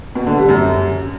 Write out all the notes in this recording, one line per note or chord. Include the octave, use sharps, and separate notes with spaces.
B2
D3
G3
F#2